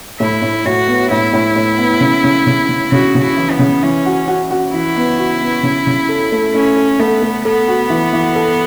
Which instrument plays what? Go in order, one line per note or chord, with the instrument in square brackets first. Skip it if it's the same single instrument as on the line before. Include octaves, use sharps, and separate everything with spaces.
[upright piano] A2 [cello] E4
[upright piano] A2
[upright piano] A2 [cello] F#4
[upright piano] B3
[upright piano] A2 [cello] E4
[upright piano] A2
A2
B3
C#3
C#3
C#3
C#3
[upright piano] C#3 [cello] F#4
[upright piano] C#3
[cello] E4
[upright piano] E3
[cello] B3
[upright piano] C#3
[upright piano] E3 [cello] C#4
[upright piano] F#4
F#4
F#4
[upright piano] E3 [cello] E4
[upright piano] B3
F#4
B3
C#3
C#3
A4
A3
[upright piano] A3 [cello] C#4
[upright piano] A4
[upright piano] A3 [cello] B3
[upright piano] A3
[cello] B3 [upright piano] A4
[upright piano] F#4
E3
E3
A4